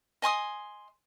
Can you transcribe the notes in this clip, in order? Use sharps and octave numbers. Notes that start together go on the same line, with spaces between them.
D#5 G#5 C6 D#6